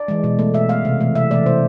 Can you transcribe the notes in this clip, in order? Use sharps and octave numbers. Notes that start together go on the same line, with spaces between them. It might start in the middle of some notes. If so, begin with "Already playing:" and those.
Already playing: D5
E3 G#3
B2
A3
B2 E5
A3 F5
C3
E3 A3
C3 E5
E3 A3 D5
C3 C5